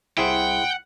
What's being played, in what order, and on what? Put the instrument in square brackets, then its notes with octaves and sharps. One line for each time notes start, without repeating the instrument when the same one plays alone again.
[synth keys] C2 [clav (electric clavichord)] E4 G#4 C5 [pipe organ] F#5 [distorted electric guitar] G5